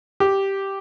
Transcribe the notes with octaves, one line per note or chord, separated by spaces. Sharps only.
G4